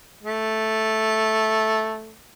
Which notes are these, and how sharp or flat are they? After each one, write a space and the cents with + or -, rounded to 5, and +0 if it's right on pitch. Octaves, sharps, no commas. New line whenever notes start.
A3 -5